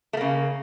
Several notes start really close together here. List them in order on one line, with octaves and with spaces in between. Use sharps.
A3 A#3 C#3